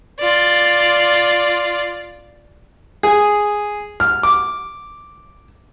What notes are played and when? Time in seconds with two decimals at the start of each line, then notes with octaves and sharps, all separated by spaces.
0.20 F4 D5
3.03 G#4
4.00 F6
4.23 D6